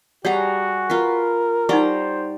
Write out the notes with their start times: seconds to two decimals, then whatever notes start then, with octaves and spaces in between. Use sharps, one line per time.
0.25 G3 F#4 G#4 C#5 F#5 A#5
0.90 F4 A#4 B4
1.69 G3 D#4 C5 D5 F#5 A#5 C#6